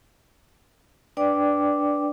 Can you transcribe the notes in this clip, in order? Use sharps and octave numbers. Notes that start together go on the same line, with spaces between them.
D4 B4 D5 G5 D6